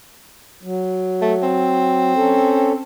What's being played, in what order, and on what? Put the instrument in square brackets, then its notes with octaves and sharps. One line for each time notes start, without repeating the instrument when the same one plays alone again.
[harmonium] F#3
[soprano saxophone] A3
C4
[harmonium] C#4 A4